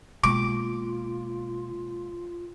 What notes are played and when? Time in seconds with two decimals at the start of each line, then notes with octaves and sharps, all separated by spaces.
0.24 B2 G#3 A#3 F4 D6